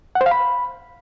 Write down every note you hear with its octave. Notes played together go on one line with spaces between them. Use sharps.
F#5
C5
F5
B5